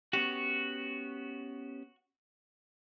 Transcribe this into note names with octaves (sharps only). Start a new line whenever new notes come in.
B3 C#4 F#4 G4